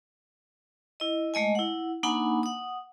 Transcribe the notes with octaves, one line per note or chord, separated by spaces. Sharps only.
E4 D#5
G#3 A3 D#5 G#5
E4 F#5
A#3 D4 D#4 F#5 G#5 B5
F#5 D#6